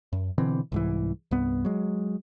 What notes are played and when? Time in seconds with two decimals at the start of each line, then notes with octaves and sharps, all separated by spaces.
0.13 F#2
0.38 B2 D3 E3 C4
0.72 C2 G#2 E3
1.31 C2 G2 B3
1.65 F#3 G#3